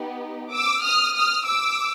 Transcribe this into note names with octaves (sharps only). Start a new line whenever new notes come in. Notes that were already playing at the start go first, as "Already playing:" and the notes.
Already playing: B3 D#4 G4
D6 E6
D#6 F6
D#6 F6
D6 E6